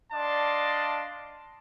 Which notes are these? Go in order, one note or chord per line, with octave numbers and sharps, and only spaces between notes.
D4 D5 D#5 F5 A5 C6